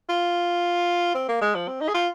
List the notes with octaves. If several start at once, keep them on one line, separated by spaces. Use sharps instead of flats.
F4
C4
A#3
G#3
F3
C4
D#4
G#4
F4